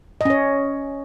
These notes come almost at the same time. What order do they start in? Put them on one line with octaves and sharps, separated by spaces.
D#5 C#4 C#5